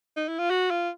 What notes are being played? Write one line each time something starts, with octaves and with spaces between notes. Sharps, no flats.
D#4
E4
F4
F#4
F4